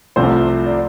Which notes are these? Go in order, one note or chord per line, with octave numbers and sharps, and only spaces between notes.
C2 C3 F3 A3 C5
D5